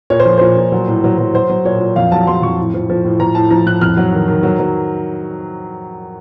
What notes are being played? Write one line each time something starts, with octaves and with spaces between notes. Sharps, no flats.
A#2 C#5
C5
F3
A#2 C5
A#2
F#3
A2
F#3
F#3
F#3 C5
F#3
A#2 C#5
A#2
F2 F5
F#3 A5
F#3 C6
F2 C#6
A2
F3
F3
A2
F3 A#5
A2 A5
F3 A#5
A2 F#6
F2 F6
F#3
D#3
D#3
F#3
F#3